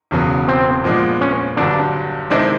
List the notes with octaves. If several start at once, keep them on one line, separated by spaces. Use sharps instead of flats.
E1 E2 C#3 F#3 B3
C4
A#2 F3 G#3 B3 D4
C#4
G1 G2 D3 F#3 D4
C3 D#3 G#3 C4 D4 E4